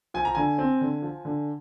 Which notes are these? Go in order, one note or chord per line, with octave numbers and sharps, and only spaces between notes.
F3 G#5
A#5
D3 G#5
C4
D3
F3
D3